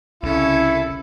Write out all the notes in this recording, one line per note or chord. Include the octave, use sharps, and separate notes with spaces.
C2 C#3 C#4 E4 A4